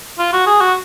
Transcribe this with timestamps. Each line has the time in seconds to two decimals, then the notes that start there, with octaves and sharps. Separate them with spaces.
0.19 F4
0.33 F#4
0.46 G#4
0.61 F#4